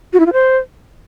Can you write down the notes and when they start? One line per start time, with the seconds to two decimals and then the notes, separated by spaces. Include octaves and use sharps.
0.13 F#4
0.19 E4
0.26 F4
0.33 C5